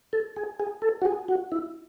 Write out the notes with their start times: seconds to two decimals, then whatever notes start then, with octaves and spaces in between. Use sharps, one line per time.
0.13 A4
0.36 G#4
0.60 G#4
0.82 A4
1.02 F#4
1.05 G#4
1.28 F#4
1.52 E4